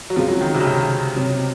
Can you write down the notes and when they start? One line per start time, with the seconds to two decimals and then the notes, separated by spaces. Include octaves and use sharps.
0.10 F#3
0.16 C#2 C#3 F3 G#3 C4
0.28 F#3
0.41 D#3
0.54 C3
0.60 C#3
0.67 C3
1.16 C3 F#3 C4